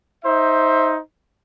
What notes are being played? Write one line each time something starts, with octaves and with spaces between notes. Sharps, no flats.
D#4 C5 E5